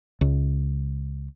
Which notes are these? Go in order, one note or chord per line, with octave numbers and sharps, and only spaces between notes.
C#2